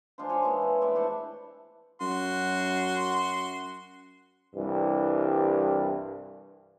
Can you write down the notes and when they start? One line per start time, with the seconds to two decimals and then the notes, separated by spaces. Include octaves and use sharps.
0.18 G#3 D4 F4 C5
0.29 F4 C#5 G#5
0.42 E3 G#3 A#3 E4
0.62 B4
0.81 A2 B3 D5 E5
0.95 D4 C5 C#5 A5
2.01 F#2 F#4 C6
4.54 C2 G2 E3